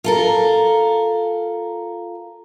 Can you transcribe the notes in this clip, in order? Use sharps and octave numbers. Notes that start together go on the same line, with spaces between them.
F4 A4 A#4